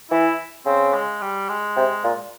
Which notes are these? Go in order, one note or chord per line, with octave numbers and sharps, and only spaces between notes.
E3 E4
C#3 C4
G#3
G3
G#3
C3
A#2